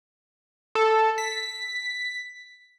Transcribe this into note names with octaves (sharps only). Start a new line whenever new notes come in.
A4
B6